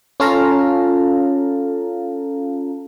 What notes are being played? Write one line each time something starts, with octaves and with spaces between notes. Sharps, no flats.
C#4 F4 A4 F5 A5 A#5